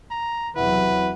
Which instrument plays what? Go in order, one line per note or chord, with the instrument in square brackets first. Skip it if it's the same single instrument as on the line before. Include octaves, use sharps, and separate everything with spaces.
[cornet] A#5
[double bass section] E2 C3 F#3 [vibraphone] E4 E5 F#5 [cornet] B4